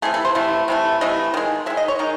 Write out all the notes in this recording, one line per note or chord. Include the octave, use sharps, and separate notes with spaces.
C3 E3 A3 G#4
A4
C5
C3 E3 A3
C3 E3 A3
C3 E3 A3 D#5
D#3 G#3
D#3 G#3 E5
D#5
C#5
D#3 G#3 D#4